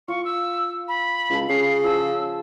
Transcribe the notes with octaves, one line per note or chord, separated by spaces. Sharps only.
F4 C#6
E6
B5
C#2 F4 A4
C#3 C7
F3 G#4 A5 E6